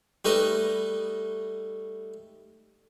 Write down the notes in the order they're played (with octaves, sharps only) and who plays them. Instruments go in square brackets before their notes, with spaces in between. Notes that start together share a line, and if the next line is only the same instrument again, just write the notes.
[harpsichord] G3 A3 D#4 B4 D#5